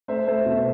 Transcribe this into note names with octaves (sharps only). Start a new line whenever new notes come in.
A3 C5 E5
A3 C5 E5
B2